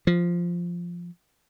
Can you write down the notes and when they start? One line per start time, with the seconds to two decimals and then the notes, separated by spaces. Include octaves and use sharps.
0.07 F3